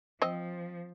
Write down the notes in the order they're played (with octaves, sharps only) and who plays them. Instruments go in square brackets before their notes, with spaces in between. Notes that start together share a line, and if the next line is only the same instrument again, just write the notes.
[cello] F3 [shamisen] C4 D#5